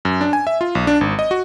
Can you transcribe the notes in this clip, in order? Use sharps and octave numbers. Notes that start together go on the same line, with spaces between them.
F#2
D4
G#5
E5
F4
B1
D4
G#1
D#5
F#4